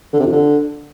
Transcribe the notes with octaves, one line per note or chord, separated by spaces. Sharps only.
D3
C3
F2
D3